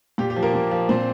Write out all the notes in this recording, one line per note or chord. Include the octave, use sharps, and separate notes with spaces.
A#2 G4
G4
F3
A#3 A#4
A#2
F3
A#2 C4 C5